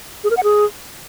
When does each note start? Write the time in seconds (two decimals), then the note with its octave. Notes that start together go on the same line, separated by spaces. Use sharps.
0.24 G#4
0.31 A#4
0.37 F#5
0.44 G#4